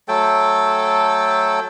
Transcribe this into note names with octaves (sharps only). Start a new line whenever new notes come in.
F#3 A3 A4 G5